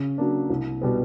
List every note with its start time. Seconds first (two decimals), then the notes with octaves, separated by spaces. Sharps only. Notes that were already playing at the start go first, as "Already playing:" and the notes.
Already playing: C#3
0.18 F#3 A#3 D4
0.50 C2
0.81 B2 G3 B3